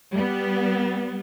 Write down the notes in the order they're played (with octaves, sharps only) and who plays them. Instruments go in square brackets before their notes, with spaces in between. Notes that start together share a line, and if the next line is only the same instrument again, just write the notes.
[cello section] G3 B3